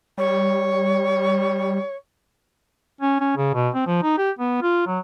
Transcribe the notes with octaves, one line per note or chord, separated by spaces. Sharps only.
G3 C#5
C#4
C#4
C#3
B2
C4
F3
D#4
G4
B3
F4
F#3